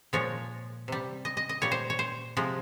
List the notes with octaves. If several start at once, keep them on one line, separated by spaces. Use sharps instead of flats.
A#2 F3 G#3 C#5
C3 G3
D#5
D#5
D#5
A#2 G3 C#5
C5
C#5
C5
C3 F3 G#3